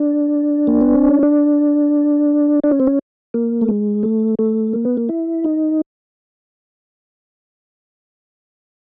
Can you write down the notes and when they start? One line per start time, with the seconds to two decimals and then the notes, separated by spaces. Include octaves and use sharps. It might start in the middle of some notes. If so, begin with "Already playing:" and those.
Already playing: D4
0.67 A#3
0.81 B3
0.95 C4
1.09 C#4
1.23 D4
2.64 D4
2.71 C#4
2.80 C4
2.87 C#4
3.34 A#3
3.61 A3
3.68 G#3
4.03 A3
4.39 A3
4.73 A#3
4.85 B3
4.97 A#3
5.09 E4
5.44 D#4